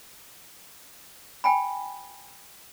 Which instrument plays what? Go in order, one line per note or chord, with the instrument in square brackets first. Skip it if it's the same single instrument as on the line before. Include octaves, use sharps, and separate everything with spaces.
[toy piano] G5 G#5 B5